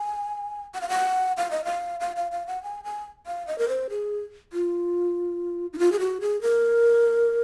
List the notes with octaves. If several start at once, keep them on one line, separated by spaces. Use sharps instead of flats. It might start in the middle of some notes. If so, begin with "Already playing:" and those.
Already playing: G#5
F#5
F5
F#5
F5
D#5
F5
F5
F5
F5
F#5
G#5
G#5
F5
D#5
A#4
C5
G#4
F4
D#4
F4
G#4
F#4
G#4
A#4